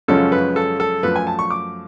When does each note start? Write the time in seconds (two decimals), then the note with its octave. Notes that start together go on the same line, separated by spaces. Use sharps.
0.08 F#2 C#3 F3 G#3 C#4 A4
0.32 B4
0.56 A4
0.80 A4
1.03 F#2 F3 A3 B4
1.16 G#5
1.27 A5
1.39 C#6
1.51 D6